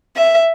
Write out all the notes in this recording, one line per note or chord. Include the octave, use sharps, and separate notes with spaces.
E5